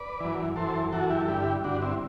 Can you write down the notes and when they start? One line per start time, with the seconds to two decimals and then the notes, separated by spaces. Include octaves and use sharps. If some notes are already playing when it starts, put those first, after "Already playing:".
Already playing: B4 D5
0.20 F#2 E3
0.56 F#2 E3 A4 C5
0.92 F#2 E3 F#4 A4
1.10 E4 G4
1.20 A4
1.28 G2 D3 E4 G4
1.64 G2 D3 D4 F#4
1.82 C4 E4